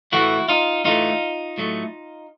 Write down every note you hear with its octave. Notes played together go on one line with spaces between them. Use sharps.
A2 E3 A3 E4 F#4
D#4 F4
A2 E3 A3 D#4 F4
A2 F#3 A3